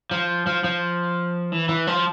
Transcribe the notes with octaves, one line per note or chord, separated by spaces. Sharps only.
F3
F3
F3
E3
E3
F3